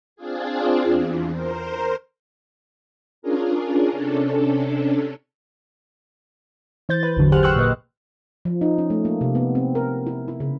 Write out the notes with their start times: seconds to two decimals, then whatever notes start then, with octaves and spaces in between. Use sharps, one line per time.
0.16 C4 D4 F4 G#4
0.83 E2
1.33 A#4 C5
3.22 C#4 D4 F4 G#4 A#4
3.92 C3 C#4 D4 A4
6.89 E3 C5 G6 A6
7.03 B4
7.16 G#1 E2 D3 F#3
7.32 G4 G#4 C5 F#5 F6 F#6
7.43 F#5 G5 C6 C#6 E6 F#6
7.56 A#2 A#3 B4 D#5
8.45 F3
8.61 D#4
8.78 C#4
8.90 A3
9.05 A#3
9.21 C3
9.35 B3
9.55 C4
9.75 A#4
10.07 E4
10.28 E4
10.40 C#3